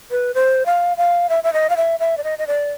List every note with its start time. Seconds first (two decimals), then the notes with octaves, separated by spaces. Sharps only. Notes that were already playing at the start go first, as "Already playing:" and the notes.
0.11 B4
0.34 C5
0.66 F5
0.97 F5
1.29 E5
1.44 E5
1.53 D#5
1.70 F5
1.77 E5
2.00 E5
2.18 D5
2.24 D#5
2.39 D#5
2.47 D5